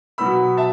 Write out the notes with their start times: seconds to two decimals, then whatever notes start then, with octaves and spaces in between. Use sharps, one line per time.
0.18 B2 F#3 B3 B5 E6
0.57 E5 A5